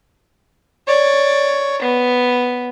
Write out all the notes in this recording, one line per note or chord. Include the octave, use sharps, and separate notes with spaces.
C#5 D5
B3